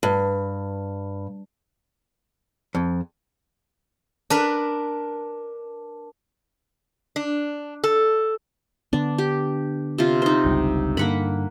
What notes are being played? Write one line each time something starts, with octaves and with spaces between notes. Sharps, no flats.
G2
F2
D4 A#4 B4
D4
A4
D3 B3 D4
G4
C3 F4
D#4 C5
G1 C#2 G2
G2 D3 A#3 F#5 B5